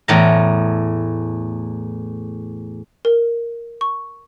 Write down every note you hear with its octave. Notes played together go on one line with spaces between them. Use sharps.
E2 A2 A#5
A#4
C#6